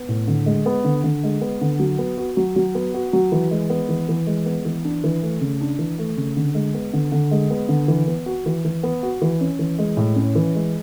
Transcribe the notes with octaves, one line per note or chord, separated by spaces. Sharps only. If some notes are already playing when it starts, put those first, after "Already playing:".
Already playing: B3
A2
D3
G#3
B3
D3
D3
G#3
B3
D3
F#3
B3
F#4
F#3
F#3
B3
F#4
F#3
E3
G#3
B3
E3
E3
G#3
B3
E3
D4
E3
A3
C#3
D4
E3
A3
C#3
D3
G#3
B3
D3
D3
G#3
B3
D3
E3
B3
F#4
E3
E3
B3
F#4
E3
C#4
E3
G#3
A2
C#4
E3
G#3